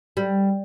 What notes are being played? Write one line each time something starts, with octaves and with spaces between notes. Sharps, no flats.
G3